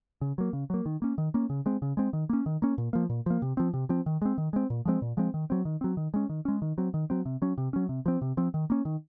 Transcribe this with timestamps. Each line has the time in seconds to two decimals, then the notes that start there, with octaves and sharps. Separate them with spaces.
0.21 C#3
0.38 F#3 A#3
0.53 C#3
0.70 F#3 A#3
0.86 D#3
1.02 A#3 C#4
1.18 D#3
1.34 A#3 C#4
1.50 C#3
1.66 G#3 C4
1.82 C#3
1.97 G#3 C4
2.13 D#3
2.29 A#3 C#4
2.46 D#3
2.62 A#3 C#4
2.78 A#2
2.93 F3 A#3
3.10 A#2
3.26 F3 A#3
3.42 C3
3.57 F3 C4
3.74 C3
3.89 F3 C4
4.06 D#3
4.22 G#3 C4
4.38 D#3
4.53 G#3 C4
4.70 A#2
4.85 F3 G#3 C4
5.02 A#2
5.17 F3 G#3 C4
5.34 D#3
5.50 F#3 C4
5.65 D#3
5.81 F#3 C4
5.97 D#3
6.14 G#3 C#4
6.29 D#3
6.45 G#3 C#4
6.62 D#3
6.78 F#3 C4
6.94 D#3
7.10 F#3 C4
7.26 C3
7.42 F#3 C#4
7.58 C3
7.73 F#3 C#4
7.89 C3
8.06 F3 C4
8.22 C3
8.37 F3 C4
8.54 D#3
8.70 A#3 C#4
8.85 D#3